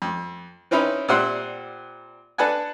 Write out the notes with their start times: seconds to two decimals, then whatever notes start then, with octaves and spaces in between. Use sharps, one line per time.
0.02 F2
0.71 C4 C#4 D#4 E4 B4
1.08 A#2 G3 C4 E5 F#5 C6
2.38 D4 A4 B4 F#5 G#5